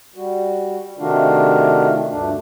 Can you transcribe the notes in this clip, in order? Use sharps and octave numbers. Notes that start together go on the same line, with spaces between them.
G3 F#4
C3 D#3 A3 D4 F4 F#4
D2 G2 A3 D4